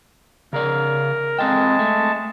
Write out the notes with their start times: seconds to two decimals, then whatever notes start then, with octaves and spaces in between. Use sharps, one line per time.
0.53 C#3 G#4 A#4 D5
1.39 G#3 C4 A4 G5 A5
1.79 A3